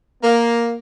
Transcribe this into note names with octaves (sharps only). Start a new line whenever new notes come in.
A#3